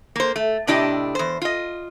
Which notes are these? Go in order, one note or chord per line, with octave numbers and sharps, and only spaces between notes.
A#3 C5
A3
A2 C3 D4 E4 G4 D#5
E2 C5
F4 D#5